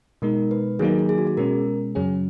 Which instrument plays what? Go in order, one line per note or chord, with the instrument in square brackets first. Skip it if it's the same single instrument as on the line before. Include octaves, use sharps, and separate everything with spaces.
[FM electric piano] B2 G#3 D#4 [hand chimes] A#4
[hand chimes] B4
[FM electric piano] D#3 F#3 A#3 D#4 [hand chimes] G#4
[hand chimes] A#4
G#4
G#4
F#4
G#4
[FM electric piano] B2 G#3 C#4 [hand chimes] A#4
[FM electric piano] F#2 C#3 F#3 C#4 G#4